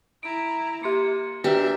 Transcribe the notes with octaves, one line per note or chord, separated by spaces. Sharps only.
E4 A#5 D7
A#3 G4 C6 C#7
D4 F#4 G4 A#4 B4 E5